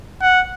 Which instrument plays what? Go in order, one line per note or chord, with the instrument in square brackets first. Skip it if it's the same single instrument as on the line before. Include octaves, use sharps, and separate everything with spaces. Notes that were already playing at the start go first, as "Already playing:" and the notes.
[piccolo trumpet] F#5